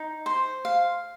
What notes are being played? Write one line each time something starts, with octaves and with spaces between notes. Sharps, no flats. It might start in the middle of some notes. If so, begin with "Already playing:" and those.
Already playing: D#4
C5
F5